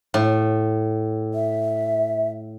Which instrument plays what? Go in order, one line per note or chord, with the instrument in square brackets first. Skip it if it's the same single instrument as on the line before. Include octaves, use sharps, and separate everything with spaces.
[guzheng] A2
[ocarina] E5